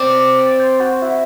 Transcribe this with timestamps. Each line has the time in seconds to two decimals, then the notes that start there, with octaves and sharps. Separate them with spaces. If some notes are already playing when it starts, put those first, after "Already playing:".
Already playing: C4 D5
0.39 D5
0.60 C5
0.80 F#4
1.02 E4